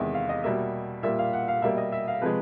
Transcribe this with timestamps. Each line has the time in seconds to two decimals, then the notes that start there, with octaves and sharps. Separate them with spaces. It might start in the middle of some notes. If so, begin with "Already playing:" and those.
Already playing: E2 C3 D#3 G#3 E5
0.14 F5
0.29 D#5
0.44 B2 G3 A#3 E5
1.03 A#2 G3 A#3 E5
1.19 F5
1.33 F#5
1.48 F5
1.62 B2 G3 A#3 E5
1.77 D#5
1.92 E5
2.08 F5
2.22 C3 F3 G#3 B4